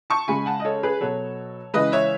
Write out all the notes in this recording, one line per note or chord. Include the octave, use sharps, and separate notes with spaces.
A5 C#6
C#3 G#3 G#5 B5
F#5 A5
D#5
A4 C#5
G#4 B4
B2 F#3 A4 C#5
C#3 E3 G#3 B4 D#5
C#5 E5